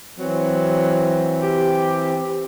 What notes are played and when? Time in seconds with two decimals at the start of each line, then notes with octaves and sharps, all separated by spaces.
0.18 E3 F#3 C4
1.41 G4